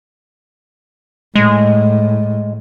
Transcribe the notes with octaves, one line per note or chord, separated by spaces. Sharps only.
A2 G#3